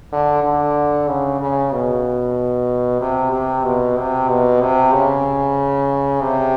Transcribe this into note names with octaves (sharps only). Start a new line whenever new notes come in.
D3
D3
C#3
C#3
B2
C3
C3
B2
C3
B2
C3
C#3
C3